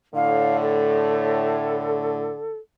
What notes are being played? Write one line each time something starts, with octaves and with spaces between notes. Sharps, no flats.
A2 D3 F5
A4